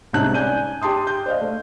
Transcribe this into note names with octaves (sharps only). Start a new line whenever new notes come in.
C2 G#2 C#4 D#4 A5 F#6
D5 G#5 G6 D#7
G4 A5 C6 D#6
G6
C5 D5 D#5 F5
A3